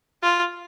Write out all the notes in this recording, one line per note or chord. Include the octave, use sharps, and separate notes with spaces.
F4